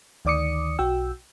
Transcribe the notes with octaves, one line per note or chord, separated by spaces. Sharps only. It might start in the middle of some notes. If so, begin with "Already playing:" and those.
D2 D#3 D5 D6 D#6 C#7
B1 F#4 G5 E6